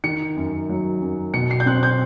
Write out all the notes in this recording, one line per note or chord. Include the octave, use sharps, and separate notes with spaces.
D#3 C#7
F#2
F#3
F#2
B2 C#7
C7
G6
C4 F#6
G6